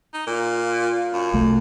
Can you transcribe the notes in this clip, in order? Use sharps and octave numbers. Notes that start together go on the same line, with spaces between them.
D#4
A#2 F4
F#2
C2 A3